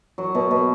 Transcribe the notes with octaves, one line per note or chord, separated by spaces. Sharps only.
F#3
B2
B2